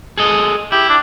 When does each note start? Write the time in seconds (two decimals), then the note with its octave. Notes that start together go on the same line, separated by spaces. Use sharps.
0.18 G#4 A4 D#5
0.72 E4 G4
0.89 D4